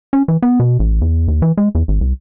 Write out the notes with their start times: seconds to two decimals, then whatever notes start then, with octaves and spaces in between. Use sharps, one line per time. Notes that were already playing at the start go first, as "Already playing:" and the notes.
0.13 C#4
0.28 E3
0.42 B3
0.60 B2
0.79 A1
1.01 E2
1.28 D#2
1.42 E3
1.57 G#3
1.75 E2
1.88 G#1
2.01 C2